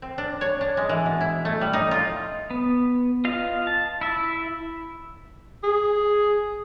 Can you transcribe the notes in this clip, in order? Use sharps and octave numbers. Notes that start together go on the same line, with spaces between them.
C4
D4
C#5
D4
G#3
E3
B2
E4
A3
G3
D#4
F4
B3
F4 D#5 F5
A5
E4 E5
G#4